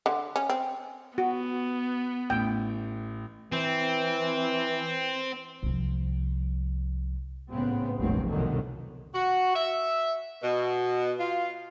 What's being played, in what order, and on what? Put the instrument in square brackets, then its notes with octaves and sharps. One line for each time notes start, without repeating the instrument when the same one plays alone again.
[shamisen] D3
C#4
C4
[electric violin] B3 [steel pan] F#4
[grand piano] A1 [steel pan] G5
[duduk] E3 [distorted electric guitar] C4
[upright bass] C2 F3
[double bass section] A1 G#2 C#3 B3 C4
F1 A#1 G2 D#3 F#3 C4
C2 F2 B2 D3 D#3 F#3
[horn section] F#4
E5
B2
F4